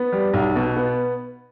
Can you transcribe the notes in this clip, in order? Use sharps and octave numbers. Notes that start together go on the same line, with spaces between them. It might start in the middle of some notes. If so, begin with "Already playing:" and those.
Already playing: B3
G3
B1
B2
B3